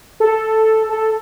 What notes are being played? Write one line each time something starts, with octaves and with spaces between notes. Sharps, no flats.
A4
A4